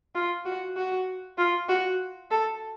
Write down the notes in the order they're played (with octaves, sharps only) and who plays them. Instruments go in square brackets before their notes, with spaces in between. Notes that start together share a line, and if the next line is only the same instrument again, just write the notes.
[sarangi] F4
F#4
F#4
F4
F#4
A4